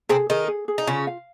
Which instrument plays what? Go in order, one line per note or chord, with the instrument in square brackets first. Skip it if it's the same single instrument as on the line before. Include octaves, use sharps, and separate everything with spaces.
[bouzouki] C3 C4 [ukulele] G#4
[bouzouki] D#3 D#4 [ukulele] G#4
[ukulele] G#4
G#4
[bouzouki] D#4
[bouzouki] C#3 C#4 [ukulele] F4
[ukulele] F5